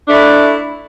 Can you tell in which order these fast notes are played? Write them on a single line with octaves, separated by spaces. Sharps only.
D4 A3 E4